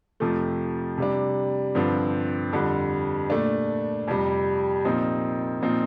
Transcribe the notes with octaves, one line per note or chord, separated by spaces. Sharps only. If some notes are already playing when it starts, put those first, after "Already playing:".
F2 C3 F3 A3
C3 G3 D4
G2 D3 F3 C4
F2 D3 G3
A#2 A3 D4
F2 C3 G3
A#2 F3 C4 D#4
A#2 F3 C4 D#4